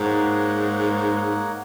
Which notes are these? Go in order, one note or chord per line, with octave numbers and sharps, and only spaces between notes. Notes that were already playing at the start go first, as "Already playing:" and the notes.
Already playing: G#2 A#3 D#4 A#4 C#5 F#5